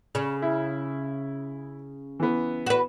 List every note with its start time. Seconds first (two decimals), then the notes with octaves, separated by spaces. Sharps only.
0.15 C#3
0.42 E4
2.20 E3 B3
2.66 F#4 B4